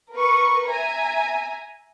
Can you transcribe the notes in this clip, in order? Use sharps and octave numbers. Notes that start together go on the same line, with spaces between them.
A#4 B4 C#6
E5 G#5 A#5